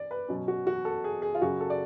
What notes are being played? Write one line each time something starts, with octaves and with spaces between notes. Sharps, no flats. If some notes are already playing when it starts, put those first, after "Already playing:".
Already playing: D5
B4
B2 F#3 C#4
F#4
F#4
A4
G#4
G#4
F4
F#2 C#3 F#3 C#4 F#4
A4
D5